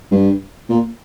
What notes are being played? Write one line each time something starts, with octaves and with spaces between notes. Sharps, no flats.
G2
A#2